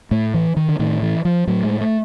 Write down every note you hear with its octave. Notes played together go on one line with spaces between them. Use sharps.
A2 A3
E3
D#3
D3
A2 D#3
E3
F3
A2 F#3
G#3
A3